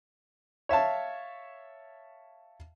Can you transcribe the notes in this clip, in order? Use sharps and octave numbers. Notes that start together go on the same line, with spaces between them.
C#5 E5 F5 A5